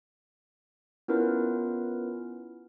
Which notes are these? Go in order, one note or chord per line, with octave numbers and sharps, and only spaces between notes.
B3 C#4 E4 F4 A#4 B4